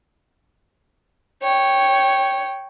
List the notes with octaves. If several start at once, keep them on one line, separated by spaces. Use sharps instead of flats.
C#5 G5